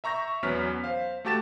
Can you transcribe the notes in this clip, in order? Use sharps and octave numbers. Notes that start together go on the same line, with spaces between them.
E5 A#5 C#6 G6 A#6
E2 F#3 B3 C#4 F6 B6
C5 F5
A3 F#4 G4 A5 A6 E7